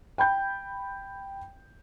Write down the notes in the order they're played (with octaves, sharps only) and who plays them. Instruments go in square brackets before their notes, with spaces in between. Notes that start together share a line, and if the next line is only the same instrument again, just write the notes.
[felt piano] G5 B5 G6